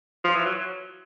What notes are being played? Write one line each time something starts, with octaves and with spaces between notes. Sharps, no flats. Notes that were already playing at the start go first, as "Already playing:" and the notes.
F3
E3
F#3